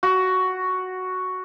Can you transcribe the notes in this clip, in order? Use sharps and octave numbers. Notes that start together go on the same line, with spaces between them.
F#4